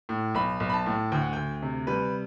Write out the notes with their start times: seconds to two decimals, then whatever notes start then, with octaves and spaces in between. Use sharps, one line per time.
0.09 A2
0.35 B1 B5
0.60 B1
0.70 B5
0.73 A5
0.86 A2
1.12 D2 G5
1.22 F#5
1.33 D2 G5
1.62 C3
1.87 G3 B4